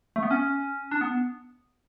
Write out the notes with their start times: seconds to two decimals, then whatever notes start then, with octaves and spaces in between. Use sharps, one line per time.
0.16 A3
0.23 B3
0.31 C#4
0.91 D4
1.01 B3